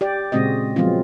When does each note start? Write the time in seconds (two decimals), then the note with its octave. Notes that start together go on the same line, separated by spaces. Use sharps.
0.01 G4 D5
0.32 A#2 C#3 G#3 C4 F#4 D#5
0.76 F3 F#3 G#3 B3 C4 F4